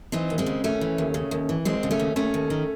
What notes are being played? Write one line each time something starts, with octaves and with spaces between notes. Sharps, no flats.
E3 C4 D#4
D#2
G#3 C4
C#3
D#2 A3 C#4
E3
D#2
C#3
D#2
E3
D#2 G#3 C4
C#3
A3 C#4
D#2
D#2 A3 C#4
D#2
D#3